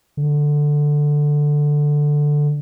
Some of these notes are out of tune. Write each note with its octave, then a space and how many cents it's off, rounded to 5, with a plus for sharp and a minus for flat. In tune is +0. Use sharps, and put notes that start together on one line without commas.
D3 +5